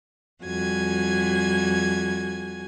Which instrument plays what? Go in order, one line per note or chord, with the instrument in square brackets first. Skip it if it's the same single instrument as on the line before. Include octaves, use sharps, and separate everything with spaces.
[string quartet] F2 G3 F#4 G#5 G#6